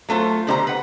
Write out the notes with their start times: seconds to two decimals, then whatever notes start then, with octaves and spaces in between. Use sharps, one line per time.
0.09 F#3 A3 F4 C5
0.47 B2 D3 D4 G4 C5 A#5
0.67 B4 F#5